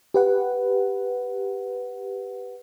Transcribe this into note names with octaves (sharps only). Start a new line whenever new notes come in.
G4 B4 F#5